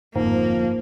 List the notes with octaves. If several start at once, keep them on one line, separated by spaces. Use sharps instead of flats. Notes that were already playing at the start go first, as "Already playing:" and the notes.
G1 F2 G#2 F3 A#3